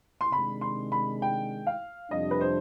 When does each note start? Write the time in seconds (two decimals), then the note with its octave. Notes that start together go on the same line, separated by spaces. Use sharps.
0.21 C6
0.32 C3 D#3 G#3 D4 B5
0.61 C6
0.92 B5
1.22 G5
1.67 F5
2.11 F2 C3 G3 D4 D#5
2.31 B4
2.41 C5